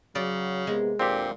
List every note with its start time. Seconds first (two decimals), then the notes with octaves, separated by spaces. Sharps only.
0.15 C#3 F#3 D5
0.67 C3 G#3 A#3 B3
0.99 D2 A#2 C4 G4